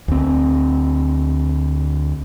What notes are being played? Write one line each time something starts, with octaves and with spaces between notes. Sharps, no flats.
D2 C4